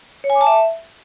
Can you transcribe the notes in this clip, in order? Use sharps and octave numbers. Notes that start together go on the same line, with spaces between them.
C#5
G#5
D6
A5
E5